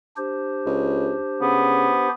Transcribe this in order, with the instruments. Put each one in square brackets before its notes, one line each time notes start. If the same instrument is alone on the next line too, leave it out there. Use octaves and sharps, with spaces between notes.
[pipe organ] D4 G4 C5
[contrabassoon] C#2
[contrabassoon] C#3 [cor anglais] B3